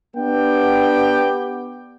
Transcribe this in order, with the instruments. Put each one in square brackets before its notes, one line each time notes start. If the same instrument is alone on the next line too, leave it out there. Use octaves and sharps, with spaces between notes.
[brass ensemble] B3 D4 G4 G5